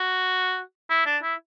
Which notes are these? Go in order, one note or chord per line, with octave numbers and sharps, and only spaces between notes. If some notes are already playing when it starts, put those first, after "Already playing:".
Already playing: F#4
E4
D4
E4